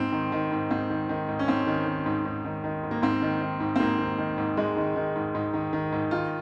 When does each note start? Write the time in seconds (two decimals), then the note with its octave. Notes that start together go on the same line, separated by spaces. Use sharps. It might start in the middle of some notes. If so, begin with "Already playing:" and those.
Already playing: G#2 C4
0.12 D#3
0.32 D#3
0.51 G#2
0.71 G#2 C4
0.90 D#3
1.09 D#3
1.29 G#2
1.39 C#4
1.48 G#2 C4
1.67 D#3
1.86 D#3
2.06 G#2
2.25 G#2
2.45 D#3
2.64 D#3
2.83 G#2
2.91 A#3
3.02 G#2 C4
3.22 D#3
3.41 D#3
3.60 G#2
3.76 C4
3.80 G#2 A#3
3.98 D#3
4.18 D#3
4.38 G#2
4.57 G#2 G#3
4.77 D#3
4.96 D#3
5.16 G#2
5.35 G#2
5.54 D#3
5.73 D#3
5.92 G#2
6.11 D#3 F4